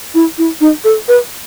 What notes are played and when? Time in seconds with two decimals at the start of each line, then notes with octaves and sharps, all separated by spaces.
0.14 E4
0.38 E4
0.61 D#4
0.84 A4
1.08 B4